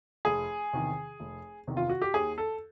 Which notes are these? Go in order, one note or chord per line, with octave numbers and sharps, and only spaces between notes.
F1 G#4
E2 C3 D#3
F1
E2 C3 D#3
F4
F#4
G4
D#2 G#4
A4